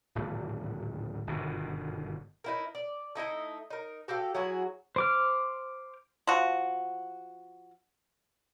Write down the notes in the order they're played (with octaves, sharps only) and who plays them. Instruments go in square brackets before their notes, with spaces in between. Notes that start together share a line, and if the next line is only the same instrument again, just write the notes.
[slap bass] D1 G#1 A#2 G#3
G1 G#2 B2 D#3
[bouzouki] D#4 E4 A#4
D5
A3 D#4 E4 D#5
D#4 A#4
F#4 G4 A4 F5
F#3 E4 F#4 G#4
[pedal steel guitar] C5 D6 F6
[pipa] F3 F#4